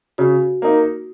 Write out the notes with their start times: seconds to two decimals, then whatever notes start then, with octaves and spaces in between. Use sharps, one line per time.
0.18 C#3 F#4
0.62 A#3 D#4